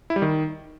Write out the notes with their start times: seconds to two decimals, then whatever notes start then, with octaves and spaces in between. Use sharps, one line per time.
0.10 E4
0.16 G3
0.22 D#3